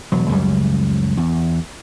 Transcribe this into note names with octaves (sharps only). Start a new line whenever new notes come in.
E1 F#3
C#2 F#2 C#3 G3
E2